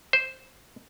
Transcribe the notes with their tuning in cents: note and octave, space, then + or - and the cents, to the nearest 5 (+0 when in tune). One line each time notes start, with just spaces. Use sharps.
C5 +0